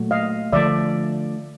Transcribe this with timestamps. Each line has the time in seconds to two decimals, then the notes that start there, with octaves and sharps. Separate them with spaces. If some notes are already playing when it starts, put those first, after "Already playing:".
Already playing: A#2 F#3 A3
0.11 D#5 F5
0.53 D3 F3 A3 D5 E5